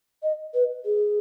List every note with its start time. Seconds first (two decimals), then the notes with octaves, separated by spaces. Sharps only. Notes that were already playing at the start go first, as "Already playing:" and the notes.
0.23 D#5
0.54 B4
0.85 G#4